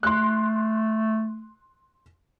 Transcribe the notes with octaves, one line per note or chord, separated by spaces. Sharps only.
A3 C6 F#6